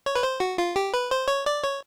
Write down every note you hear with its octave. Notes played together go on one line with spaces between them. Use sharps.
C#5
B4
C5
F#4
F4
G4
B4
C5
C#5
D5
C#5